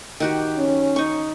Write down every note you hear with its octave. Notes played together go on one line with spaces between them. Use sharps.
D#3 F#4 G4
C#4
D#4 C#6